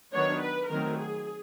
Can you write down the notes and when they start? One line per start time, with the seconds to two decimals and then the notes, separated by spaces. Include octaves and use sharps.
0.13 D#3 F#3 B3 D4 C#5
0.41 B4
0.69 D#3 F#3 A3 C4 A#4
0.98 G#4